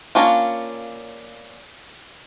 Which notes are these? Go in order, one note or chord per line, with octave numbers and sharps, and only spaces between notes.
A#3 C#4 D4 F4